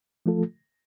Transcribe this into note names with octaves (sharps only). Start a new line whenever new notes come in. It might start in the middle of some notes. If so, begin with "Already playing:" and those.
F3 A3 F4 A4